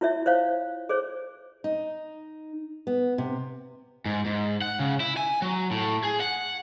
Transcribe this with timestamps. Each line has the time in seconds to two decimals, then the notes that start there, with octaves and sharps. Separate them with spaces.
0.01 E4 F4 C#5 E5
0.26 C5 C#5 F5
0.89 G#4 C5 C#5
1.64 D#4
2.87 B3
3.18 C3
4.06 G#2
4.26 G#2
4.62 F#5
4.79 C#3
5.00 E4
5.17 G#5
5.42 F#3
5.71 A2
6.04 G#4
6.20 F#5